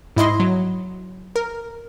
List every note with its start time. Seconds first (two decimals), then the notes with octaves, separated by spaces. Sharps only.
0.16 G#2 E4 D#5 C6
0.40 F#3
1.36 A#4